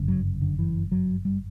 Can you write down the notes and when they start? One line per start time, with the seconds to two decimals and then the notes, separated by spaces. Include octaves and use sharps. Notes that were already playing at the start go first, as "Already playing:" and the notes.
Already playing: G1 F#2 C#3
0.08 F#3
0.42 D3
0.59 E3
0.92 F#3
1.25 G3